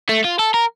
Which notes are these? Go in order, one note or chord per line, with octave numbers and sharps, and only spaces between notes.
A3
F4
A4
A#4